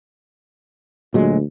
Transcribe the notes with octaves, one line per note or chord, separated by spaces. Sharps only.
D2 A#2 F#3 G#3